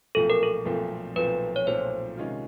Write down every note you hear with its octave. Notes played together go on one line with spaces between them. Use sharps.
B1 A#2 F3 A3 C4 A4
A#4
A4
B1 A#2 F3 A3 C4
B1 A#2 F3 A3 C4 B4
C#5
B1 A#2 F3 A3 C4 C5
C3 D#3 G#3 C#4 F4